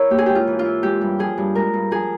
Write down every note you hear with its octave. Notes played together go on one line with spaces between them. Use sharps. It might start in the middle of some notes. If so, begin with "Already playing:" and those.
Already playing: E4 A#4 C#5
A#3 G4
G#4
G#2 G4
F4
E3
F4
E4
G#3 G4
G2
F3 G#4
G2
G#3 A#4
G2
F3 G#4